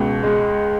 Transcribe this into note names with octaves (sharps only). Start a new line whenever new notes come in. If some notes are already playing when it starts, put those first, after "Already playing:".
Already playing: C#2 B2
G#3